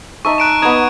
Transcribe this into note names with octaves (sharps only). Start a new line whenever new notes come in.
D#4 E5 A5 C#6
F#6 D7 E7
B3 D#4 D#6 G#6 E7